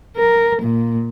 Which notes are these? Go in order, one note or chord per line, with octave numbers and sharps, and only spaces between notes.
A#4
A#2